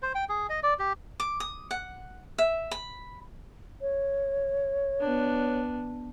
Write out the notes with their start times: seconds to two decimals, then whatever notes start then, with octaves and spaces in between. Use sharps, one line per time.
0.02 C5
0.15 G5
0.29 G#4
0.49 D#5
0.63 D5
0.79 G4
1.20 D6
1.40 D#6
1.71 F#5
2.38 E5
2.71 B5
3.81 C#5
5.00 B3 D4